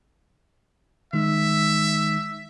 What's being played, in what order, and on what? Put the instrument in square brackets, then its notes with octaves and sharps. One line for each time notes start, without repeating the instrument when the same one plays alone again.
[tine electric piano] D#3 G#3 D#4 [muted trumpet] E5